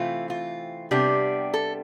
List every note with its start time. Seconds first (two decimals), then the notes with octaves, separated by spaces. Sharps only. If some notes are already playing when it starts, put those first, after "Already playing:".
Already playing: C3 E3 A3 C4 F4
0.30 F4
0.91 C3 G3 B3 D4 G4
1.54 A4